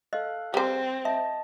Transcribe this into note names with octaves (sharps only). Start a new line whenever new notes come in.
A4 D#5 F5 F#6
G3 C4 C5
D#5 E5 A5